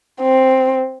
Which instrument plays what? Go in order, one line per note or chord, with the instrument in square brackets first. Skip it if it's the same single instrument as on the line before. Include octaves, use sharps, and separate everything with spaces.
[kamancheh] C4